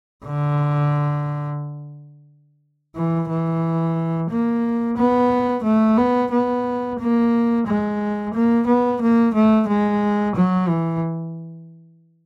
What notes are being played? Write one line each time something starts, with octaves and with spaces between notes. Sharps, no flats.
D3
E3
E3
A#3
B3
A3
B3
B3
A#3
G#3
A#3
B3
A#3
A3
G#3
F#3
E3